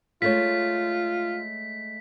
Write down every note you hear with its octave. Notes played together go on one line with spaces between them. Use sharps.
G#3 A3 F4 C#5 B6